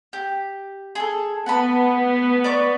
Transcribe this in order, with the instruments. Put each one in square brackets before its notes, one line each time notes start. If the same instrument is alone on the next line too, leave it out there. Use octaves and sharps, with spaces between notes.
[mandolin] G4
G#4 A4
[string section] B3 [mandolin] F#5 A5 B5
[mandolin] D5 C#6 D6